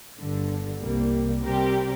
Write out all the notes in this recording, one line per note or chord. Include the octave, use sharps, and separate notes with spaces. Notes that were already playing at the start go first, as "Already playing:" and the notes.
G1 G2 D3
C2 C3 G3 A#3
C3 G3 C4 G4 A#4